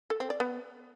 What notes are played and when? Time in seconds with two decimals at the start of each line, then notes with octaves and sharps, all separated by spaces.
0.10 A4
0.20 C4
0.30 D5
0.40 B3